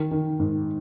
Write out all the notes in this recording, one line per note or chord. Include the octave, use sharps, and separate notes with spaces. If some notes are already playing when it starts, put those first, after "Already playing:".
Already playing: D#3
D#3
G#2